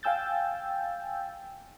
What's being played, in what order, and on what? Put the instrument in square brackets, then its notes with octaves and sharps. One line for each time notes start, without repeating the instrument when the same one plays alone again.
[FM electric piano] F5 G5 G#5 E6 G6 A6